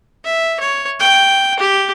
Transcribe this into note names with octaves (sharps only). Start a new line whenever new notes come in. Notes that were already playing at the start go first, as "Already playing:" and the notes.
E5
C#5
G5
G4